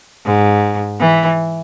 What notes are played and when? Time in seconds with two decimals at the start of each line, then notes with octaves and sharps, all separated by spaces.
0.26 G#2
1.00 E3